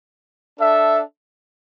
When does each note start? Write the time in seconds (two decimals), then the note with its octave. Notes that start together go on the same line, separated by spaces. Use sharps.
0.59 D4 A4 E5